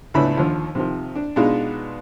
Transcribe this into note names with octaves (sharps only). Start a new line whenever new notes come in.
C#2 A2 A3 B3 D4 B5
D#2 D3 F3
C3 D#3 F3
D4
B2 G#3 B3 D4 D#4 F4